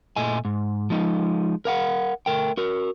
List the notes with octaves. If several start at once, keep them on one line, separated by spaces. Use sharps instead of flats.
A#2 A3 D#5 G#5
G#2
F3 G#3 D#4
A#4 F5 F#5
A3 A#4 G5
F#4 A#4